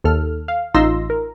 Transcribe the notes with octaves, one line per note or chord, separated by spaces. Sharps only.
D#2 A4 F6
F5
A1 D#4 F4 C6 E6 A#6
A#4